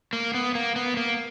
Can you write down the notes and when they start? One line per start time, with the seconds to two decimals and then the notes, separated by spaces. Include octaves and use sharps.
0.13 A#3
0.34 B3
0.55 A#3
0.76 B3
0.97 A#3